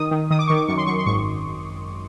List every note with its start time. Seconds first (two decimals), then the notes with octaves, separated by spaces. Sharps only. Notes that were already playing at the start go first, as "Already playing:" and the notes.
Already playing: D#3 D#6
0.11 D#3
0.30 D#3 D#6
0.39 D6
0.47 D#3 C#6
0.56 D6
0.68 F#2 C#6
0.78 C6
0.86 F#2 C#6
0.98 C6
1.06 G#1 C#6